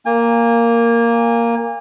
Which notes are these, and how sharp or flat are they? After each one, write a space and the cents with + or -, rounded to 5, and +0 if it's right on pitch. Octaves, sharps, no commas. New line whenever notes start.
A#3 +0 G#5 -35